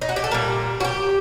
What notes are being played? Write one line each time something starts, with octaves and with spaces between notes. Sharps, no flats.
D#4
F#4
G4
A4
A#2 G3 A#4
F#4
G4